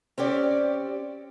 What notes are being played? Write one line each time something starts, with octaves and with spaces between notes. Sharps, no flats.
C4 C#4 G4 D5